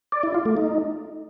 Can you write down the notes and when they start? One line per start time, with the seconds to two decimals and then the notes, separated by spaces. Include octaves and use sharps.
0.12 D5
0.23 E4
0.34 F4
0.46 A3
0.57 D#4